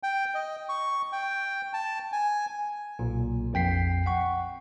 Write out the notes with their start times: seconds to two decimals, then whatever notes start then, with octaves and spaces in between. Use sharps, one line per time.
0.03 G5
0.35 D#5
0.69 C#6
1.12 G5
1.73 A5
2.12 G#5
2.99 B1 A#2
3.53 A#1 F2 G5 B6 C7
4.06 F#5 C#6